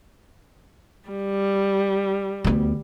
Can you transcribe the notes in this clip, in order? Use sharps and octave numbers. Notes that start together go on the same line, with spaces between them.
G3
D2 B3